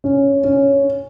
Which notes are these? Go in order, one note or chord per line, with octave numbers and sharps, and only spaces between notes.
C#4
C#4